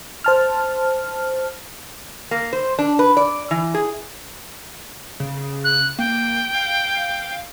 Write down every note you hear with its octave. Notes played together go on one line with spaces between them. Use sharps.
C5 A5 F6
A#3
C5
D4
B4
D5
E3
G#4
C#3
F#6
A#3 G5
F5